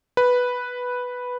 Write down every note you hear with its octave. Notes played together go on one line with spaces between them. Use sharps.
B4